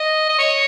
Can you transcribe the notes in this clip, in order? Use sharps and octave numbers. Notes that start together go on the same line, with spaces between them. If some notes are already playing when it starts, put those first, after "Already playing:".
Already playing: D#5
D#5
C#5